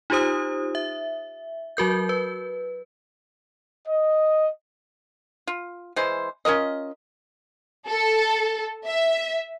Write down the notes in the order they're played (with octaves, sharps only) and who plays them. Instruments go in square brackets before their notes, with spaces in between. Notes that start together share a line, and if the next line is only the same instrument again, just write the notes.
[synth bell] D#4 F4 G4 C5 D#6
E5
F#3 F#4 A#4 G6
B4
[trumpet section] D#5
[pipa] F4
E3 G#3 C5
C#4 F4 A#4 D#5
[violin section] A4
E5